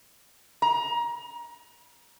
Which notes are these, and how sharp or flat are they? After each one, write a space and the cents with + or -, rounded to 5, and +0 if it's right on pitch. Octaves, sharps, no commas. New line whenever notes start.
A#5 +25